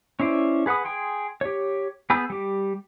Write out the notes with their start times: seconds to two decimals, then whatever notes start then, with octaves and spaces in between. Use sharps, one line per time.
0.20 C#4 E4 C5 D5
0.66 G#4 B4 F#5 B5 D#6
0.85 G#4 G5 C6
1.41 G4 C#5
2.10 B3 G#4 B5 E6 G6
2.30 G3 G4